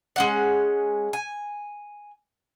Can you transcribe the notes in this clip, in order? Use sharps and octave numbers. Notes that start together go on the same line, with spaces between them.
G#3 C#4 F#5
G#5